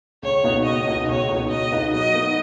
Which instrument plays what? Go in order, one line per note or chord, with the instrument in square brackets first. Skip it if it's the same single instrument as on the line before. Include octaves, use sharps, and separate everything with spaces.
[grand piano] C#2 [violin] C#5
[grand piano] B2 B3 D#4
[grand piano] C#2 [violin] D#5
[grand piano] B2 B3 D#4
[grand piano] C#2 [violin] C#5
[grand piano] B2 B3 D#4
[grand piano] C#2 [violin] D#5
[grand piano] B2 B3 D#4
[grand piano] F#3 [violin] D#5
[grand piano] B3 D#4